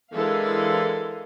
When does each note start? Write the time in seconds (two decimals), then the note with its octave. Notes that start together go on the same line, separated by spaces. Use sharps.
0.14 D3 E3 G#3 A4 A#4 F5